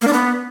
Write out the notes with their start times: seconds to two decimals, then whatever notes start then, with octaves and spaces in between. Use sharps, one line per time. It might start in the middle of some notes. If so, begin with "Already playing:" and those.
0.02 A#3
0.07 D4
0.13 B3